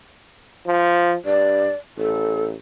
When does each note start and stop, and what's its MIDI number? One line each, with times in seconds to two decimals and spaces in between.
0.67 1.15 53
1.25 1.69 43
1.25 1.74 74
1.98 2.54 33
1.98 2.44 69